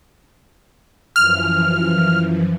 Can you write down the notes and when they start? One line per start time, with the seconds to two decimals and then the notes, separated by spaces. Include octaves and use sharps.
1.16 F#2 E3 F3 F6